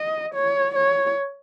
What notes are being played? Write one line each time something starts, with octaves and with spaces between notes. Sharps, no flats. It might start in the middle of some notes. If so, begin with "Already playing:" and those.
Already playing: D#5
C#5
C#5